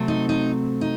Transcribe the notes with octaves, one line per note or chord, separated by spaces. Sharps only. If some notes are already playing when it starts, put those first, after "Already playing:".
Already playing: C3 F#3 A3 C4
D#4
D#4
D#4